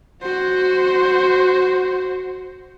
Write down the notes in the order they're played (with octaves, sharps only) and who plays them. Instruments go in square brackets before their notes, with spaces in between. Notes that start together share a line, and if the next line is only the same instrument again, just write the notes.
[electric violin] F#4 [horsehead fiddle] C5